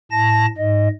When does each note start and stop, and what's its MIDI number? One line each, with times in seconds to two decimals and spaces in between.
0.11 0.46 45
0.11 0.46 81
0.11 0.46 94
0.58 0.88 44
0.58 0.88 75